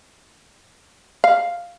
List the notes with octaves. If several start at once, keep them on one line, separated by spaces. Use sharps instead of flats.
F5